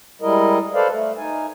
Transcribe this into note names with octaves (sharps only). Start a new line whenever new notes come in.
G3 G#3 E4 A#4 D#5
A4 B4 C5 D5 F5
A3
D#4 G#5